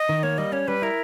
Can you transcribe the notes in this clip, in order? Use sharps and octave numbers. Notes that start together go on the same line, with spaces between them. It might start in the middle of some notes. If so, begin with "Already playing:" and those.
Already playing: D#5
D#3
A#3 C#5
G3 D#5
C#4 C#5
G3 B4
E4 A#4